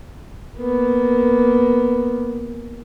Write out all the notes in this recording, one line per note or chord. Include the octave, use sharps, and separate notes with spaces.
A#3 B3